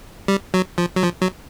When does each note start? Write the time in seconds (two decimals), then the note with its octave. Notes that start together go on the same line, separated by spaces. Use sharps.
0.28 G3
0.54 F#3
0.78 F3
0.96 F#3
1.03 F3
1.22 F#3